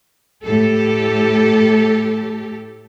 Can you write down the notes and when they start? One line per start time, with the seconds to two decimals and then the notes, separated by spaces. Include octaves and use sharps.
0.43 A2 G4 A4